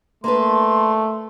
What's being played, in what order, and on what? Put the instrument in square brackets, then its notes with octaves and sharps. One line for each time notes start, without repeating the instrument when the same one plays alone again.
[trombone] A3 [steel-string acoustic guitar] A#3 D4 B4 [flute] C6